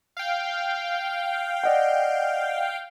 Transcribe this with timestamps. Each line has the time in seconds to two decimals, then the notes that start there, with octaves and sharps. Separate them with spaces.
0.17 F5 G5
1.64 D5 D#5 F#5